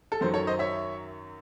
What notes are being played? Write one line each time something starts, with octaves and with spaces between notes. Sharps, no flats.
A4
F#2 D#3 F#3 C5
A4 C#5
C5 D#5
C#5 E5